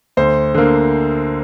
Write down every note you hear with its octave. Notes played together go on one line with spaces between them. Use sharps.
D2 C5
D3 A#3